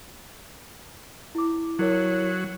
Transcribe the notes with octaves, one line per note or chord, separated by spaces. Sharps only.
E4 D6
F#3 E4 A#4 C#5